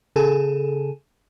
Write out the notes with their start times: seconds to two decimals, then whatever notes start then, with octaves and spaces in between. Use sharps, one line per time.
0.16 C#3 G#4 A4